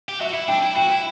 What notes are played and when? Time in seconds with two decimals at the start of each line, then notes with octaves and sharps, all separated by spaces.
0.09 G4
0.20 F#4 E5
0.34 E4
0.48 D4 G5
0.62 E4
0.76 F#4 G5
0.91 E4